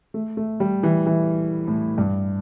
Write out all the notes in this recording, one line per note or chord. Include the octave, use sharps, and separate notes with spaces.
A3
A3
G3
E3
E3
A2
G2